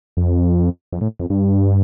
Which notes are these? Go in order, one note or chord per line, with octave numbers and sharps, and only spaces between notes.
F2
F2
A2
F2
G2